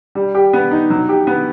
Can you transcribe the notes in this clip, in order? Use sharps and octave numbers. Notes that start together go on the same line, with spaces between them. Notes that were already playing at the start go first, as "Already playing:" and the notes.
G3
G4
B3
D#4
F#3
G4
B3